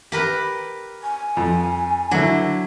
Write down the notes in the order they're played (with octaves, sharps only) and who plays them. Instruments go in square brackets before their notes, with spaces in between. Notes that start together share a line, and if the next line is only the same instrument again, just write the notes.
[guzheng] G4 A#4 B4
[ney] G#5
[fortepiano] F2
[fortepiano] D3 E4 [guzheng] F#3